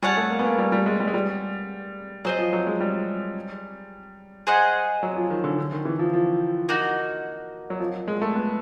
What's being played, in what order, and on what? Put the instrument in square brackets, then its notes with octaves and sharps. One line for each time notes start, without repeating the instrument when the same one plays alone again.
[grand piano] G3 [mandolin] G#4 C#5 F#5 A5
[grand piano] A3
A#3
B3
A#3
G3
G3
G#3
G3
G#3
G3
[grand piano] F#3 [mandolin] G#4 C5 D#5
[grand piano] F3
F#3
G#3
G3
[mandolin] G#4 C5 D#5 F#5
[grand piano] F#3
F3
D#3
D3
D3
D#3
E3
F3
F3
[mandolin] A#3 D#4 F#4
[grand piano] F#3
F3
G#3
A3
B3